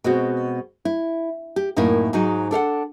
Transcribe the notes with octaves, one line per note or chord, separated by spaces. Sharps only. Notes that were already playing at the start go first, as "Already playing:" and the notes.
B2 G#3 C4 F#4
E4
G4
F#2 A2 A#3 D#4 E4
G#2 F#3 D#4
D4 A4 F5 F#5